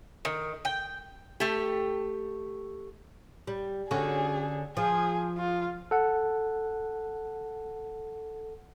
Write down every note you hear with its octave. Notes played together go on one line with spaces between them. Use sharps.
D#3
G5
A3 G4
G3
D3 C#4 F#4 G#4
F3 G#4
F4
A4 F#5